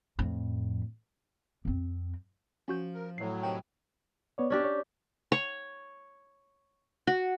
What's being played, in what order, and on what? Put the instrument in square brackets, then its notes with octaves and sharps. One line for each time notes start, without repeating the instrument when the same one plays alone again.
[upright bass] F2 A2
F2 C4
[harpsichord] F3 [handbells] C#4 F#4 G6
[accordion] A#4
[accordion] A2 F#3 [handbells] C#5 C7
[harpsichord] C3 D#3 F#4 [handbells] G5
[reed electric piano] B3 C#5 D5
[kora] C#4 D4 G4
[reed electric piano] C#5
[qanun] C#5
F#4